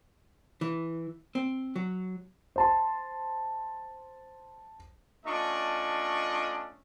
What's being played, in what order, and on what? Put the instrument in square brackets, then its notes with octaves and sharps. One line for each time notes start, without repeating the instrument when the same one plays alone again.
[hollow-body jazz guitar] E3
C4
F#3
[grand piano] C5 A5 C6
[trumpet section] A3 C#4 D4 F4 D#5 C#6